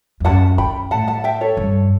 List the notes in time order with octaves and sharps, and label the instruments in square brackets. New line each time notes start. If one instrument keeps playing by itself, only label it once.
[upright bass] E2
[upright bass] F#2 [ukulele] F#5 A5
[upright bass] C#3 [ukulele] G5 B5
[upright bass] A2 [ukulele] F#5 A5
[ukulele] F#5 A5
E5 G5
A4 C#5
[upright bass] G2